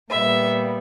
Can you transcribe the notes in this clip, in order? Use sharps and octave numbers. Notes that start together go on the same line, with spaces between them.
A#2 G3 B3 E5